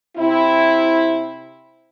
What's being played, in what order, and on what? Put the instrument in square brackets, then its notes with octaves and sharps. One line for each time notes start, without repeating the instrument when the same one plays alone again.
[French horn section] C3 C4 E4